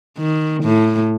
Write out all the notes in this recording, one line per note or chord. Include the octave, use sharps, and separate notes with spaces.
D#3
A2